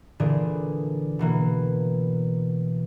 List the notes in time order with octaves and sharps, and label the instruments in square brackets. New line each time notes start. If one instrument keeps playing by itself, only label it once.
[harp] A#2 D3 E3 D4 G#4
B2 E3 A#3